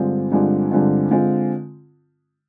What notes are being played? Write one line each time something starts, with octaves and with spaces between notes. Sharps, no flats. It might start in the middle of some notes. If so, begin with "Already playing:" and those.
Already playing: G2 D3 G#3 C4 F4
G2 D3 G#3 C4 F4
G2 D3 G#3 C4 F4
D3 G#3 C4 F4